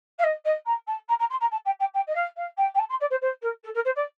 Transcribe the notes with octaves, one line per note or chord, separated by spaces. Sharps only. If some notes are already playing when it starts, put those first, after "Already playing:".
F5
D#5
D#5
A#5
A5
A#5
A#5
C6
A#5
A5
G5
G5
G5
D#5
F5
F5
G5
G5
A5
C6
D5
C5
C5
A#4
A4
A#4
C5
D5